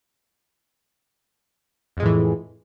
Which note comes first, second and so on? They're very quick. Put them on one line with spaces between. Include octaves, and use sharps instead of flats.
F2 G#3 A2 E3